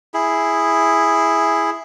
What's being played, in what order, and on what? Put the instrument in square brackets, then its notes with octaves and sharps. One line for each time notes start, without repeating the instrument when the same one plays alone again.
[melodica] E4 G#4